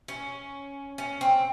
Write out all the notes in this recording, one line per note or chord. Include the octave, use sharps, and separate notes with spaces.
C#4
C#4
C4